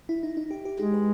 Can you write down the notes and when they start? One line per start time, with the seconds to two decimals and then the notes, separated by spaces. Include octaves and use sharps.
0.09 E4
0.23 D#4
0.37 D#4
0.51 G4
0.65 G4
0.79 G#3 D#4
0.94 B4